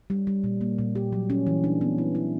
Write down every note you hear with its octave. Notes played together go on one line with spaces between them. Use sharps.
G3
G3
A#2
A#3
A#2
G4
F#3
C#4
E3
D4
B3
E4
E4